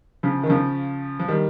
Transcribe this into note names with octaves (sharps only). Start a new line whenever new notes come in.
C#3 F3
D#3
C#3 F3
F3
D#3 G3